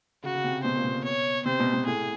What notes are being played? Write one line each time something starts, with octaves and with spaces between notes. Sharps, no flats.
C#3 F#4
C#3
C3
B2 C5
A#2
B2
C#5
C3 C5
B2
B2
A2 G#4